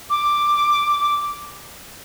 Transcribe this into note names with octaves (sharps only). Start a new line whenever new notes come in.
D6